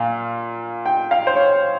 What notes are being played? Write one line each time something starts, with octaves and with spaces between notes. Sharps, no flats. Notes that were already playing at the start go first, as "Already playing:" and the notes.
Already playing: A#2 F5
G5
F5
C5
C#5